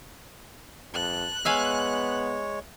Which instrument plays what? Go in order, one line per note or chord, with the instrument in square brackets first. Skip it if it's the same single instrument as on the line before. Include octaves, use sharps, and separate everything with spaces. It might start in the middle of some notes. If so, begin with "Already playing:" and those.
[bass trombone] F2 [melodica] A5 [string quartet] F#6
[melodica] G#3 C#5 [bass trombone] B3 [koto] E5 F5 G#5